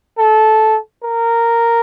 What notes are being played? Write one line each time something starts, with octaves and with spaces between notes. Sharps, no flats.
A4
A#4